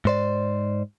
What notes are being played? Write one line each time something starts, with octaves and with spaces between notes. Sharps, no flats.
G#2 C5 D5